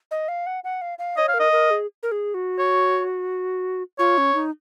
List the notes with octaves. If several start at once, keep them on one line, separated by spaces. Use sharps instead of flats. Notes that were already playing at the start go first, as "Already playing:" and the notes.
D#5
F5
F#5
F#5
F5
F5
C#5 D#5
F5
A#4
D#5
A#4
G#4
A#4
G#4
F#4
C#5
F4 C#5
C#4
D#4